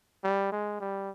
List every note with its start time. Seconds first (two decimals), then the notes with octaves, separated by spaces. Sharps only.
0.24 G3
0.52 G#3
0.81 G3